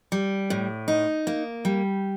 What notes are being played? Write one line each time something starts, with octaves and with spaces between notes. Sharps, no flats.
G3
A2
D#4
A#3
G3